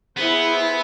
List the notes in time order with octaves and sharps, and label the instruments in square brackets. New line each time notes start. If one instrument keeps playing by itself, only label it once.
[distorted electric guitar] B3 [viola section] E4 G#4 C5